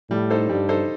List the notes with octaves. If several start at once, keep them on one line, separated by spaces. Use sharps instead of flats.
A2 G3
D#4 A4 C5
G2 G3
D#4 A4 C5